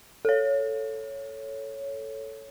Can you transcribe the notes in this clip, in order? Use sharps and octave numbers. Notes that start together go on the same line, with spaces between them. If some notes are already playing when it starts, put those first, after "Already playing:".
A4 C#5